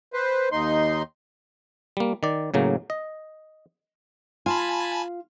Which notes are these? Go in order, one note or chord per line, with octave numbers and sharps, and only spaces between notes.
B4 C5
D#2 D#4 C6
G3 A#3
D#3 D5
A2 C#3 F#3 A#3
D#5
F4 G#5 A5 B5